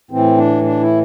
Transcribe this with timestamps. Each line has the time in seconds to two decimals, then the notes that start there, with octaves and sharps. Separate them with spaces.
0.11 A2 E3 C4
0.37 D4
0.64 D4
0.81 E4